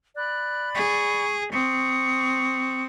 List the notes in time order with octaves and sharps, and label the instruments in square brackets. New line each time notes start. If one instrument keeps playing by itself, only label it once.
[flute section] D5 B5 [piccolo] F#6
[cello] G#4 [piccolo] C#6
[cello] C4 [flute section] C#6 D#6 [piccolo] C#7